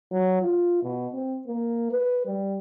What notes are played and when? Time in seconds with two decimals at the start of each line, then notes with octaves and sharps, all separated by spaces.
0.11 F#3
0.42 F4
0.83 B2
1.13 C4
1.47 A#3
1.91 B4
2.26 G3